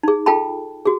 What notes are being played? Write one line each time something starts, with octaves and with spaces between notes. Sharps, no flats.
D#4 G#4
F4 A4 G5 A5 B5
F#4 G#4